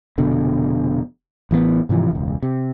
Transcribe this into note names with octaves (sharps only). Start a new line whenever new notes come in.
F1 B2 D3
A1 E3 G3 B3
G#2 C3 E3 F3
E1 C#2
C3